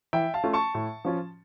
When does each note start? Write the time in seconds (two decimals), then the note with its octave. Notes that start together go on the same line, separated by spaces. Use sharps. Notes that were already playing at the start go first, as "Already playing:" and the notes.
0.13 E3 E5 G5
0.34 F5 A5
0.44 A3 C#4 F4
0.53 A5 C#6
0.75 A2
1.05 F3 C#4 F4